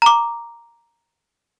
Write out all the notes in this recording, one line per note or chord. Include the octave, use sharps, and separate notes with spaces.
A#5 D6